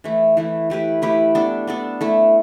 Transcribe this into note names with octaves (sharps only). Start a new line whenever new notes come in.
E3 A3 E4
E3 A3 E4
A3 E4 G4 B4
A3 E4 G4 B4
B3 D4 A4
B3 D4 A4
A3 E4 A4